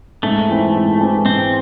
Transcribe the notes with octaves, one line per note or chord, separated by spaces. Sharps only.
G#2 A3
E3 C4 E4
G#2
E3 C4 E4
G#2 C4